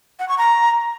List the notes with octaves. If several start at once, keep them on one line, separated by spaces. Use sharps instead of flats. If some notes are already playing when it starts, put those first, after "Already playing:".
F#5
C#6
A#5